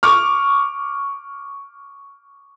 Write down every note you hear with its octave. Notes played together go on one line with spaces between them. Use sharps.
C#6 D6 F6